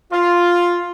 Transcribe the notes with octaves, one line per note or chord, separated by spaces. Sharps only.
F4